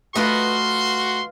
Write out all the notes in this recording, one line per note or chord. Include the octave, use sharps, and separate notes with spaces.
A3 F4 F#4 B4 D#5 C6